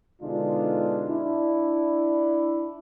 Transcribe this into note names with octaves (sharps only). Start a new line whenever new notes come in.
B2 D3 G#3 D4 D#4 F4
D4 E4